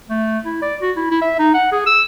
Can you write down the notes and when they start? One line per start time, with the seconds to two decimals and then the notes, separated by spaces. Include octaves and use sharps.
0.10 A3
0.44 E4
0.62 D5
0.82 F#4
0.97 E4
1.10 E4
1.22 E5
1.39 D#4
1.54 F#5
1.72 G#4
1.86 E6